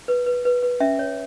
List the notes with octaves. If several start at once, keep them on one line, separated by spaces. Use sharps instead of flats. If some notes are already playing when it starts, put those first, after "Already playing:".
B4
B4
B4
B4
C#4 E5
C#5